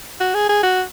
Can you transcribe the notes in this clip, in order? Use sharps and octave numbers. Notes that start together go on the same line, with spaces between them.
F#4
G#4
G#4
F#4